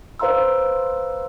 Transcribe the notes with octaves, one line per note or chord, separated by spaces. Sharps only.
B4 C5 F5 A#5 C6 E6